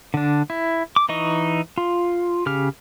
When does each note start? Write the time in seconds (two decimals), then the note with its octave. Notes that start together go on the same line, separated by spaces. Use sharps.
0.14 D3 D4
0.50 E4
0.96 D6
1.09 E3 D#4 D#5 C#6
1.78 F4
2.46 C#3 G4 F6